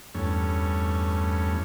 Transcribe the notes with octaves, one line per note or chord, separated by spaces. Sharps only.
E2 G2 A3 C#4